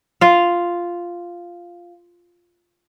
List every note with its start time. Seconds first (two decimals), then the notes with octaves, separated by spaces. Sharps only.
0.21 F4 F5